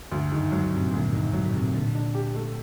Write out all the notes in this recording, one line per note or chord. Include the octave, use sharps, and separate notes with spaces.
D2 G2
F#2 D#3
F#2 F#3
G2
C3
A#2
D2 A#2
G2
A2 D#3
G2 F#3
A#2
A2 C3
A#2 D3
D4
G4
A3